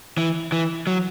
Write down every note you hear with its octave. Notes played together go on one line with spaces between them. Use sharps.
E3
E3
F#3